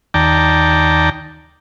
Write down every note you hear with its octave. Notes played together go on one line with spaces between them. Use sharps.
D#2 D5 G5 A5 A#5